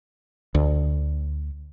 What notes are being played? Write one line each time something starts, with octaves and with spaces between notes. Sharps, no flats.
D2